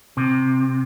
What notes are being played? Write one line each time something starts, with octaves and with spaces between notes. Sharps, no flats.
C3